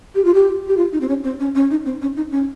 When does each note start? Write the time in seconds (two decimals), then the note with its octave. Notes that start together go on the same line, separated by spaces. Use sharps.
0.15 G4
0.25 F4
0.34 G4
0.68 G4
0.77 F4
0.93 D#4
1.01 C4
1.09 C#4
1.24 C4
1.40 C#4
1.55 C#4
1.71 D#4
1.85 C4
2.02 C#4
2.17 D#4
2.32 C#4